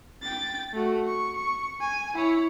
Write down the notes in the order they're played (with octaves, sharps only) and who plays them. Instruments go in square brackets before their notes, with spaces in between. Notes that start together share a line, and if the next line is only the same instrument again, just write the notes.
[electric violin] G5 A6
A3 F#4
C#6
C#6
G#5
E4 C#5